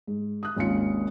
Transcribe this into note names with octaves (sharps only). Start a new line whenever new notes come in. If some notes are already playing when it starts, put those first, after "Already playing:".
G#2
D#6 F#6
G#1 D#2 C#4 F4 C#7